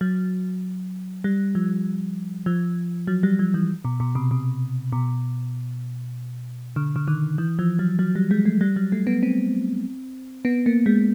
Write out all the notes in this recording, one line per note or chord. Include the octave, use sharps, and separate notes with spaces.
F#3
G3
F3
F3
F#3
G3
F3
E3
B2
B2
C3
C3
B2
D3
D3
D#3
E3
F3
F#3
F#3
G3
G#3
A3
G3
F#3
A3
B3
C4
B3
A#3
G#3